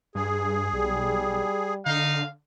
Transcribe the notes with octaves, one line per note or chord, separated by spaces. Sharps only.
G2 G#4
B1 G3
D3 D#4 F5